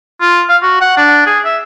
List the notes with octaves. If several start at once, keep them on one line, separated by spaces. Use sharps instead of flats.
F4
F5
F#4
F#5
D4
G#4
E5